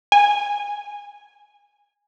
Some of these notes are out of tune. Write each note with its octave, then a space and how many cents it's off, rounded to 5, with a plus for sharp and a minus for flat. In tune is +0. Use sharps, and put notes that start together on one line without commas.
G#5 -10